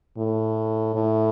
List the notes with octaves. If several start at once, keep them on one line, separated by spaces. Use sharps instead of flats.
A2
A2